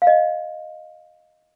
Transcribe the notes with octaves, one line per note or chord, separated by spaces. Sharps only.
F5
D#5